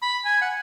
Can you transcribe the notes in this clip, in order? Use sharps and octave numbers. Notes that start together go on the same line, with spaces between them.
B5
G#5
F#5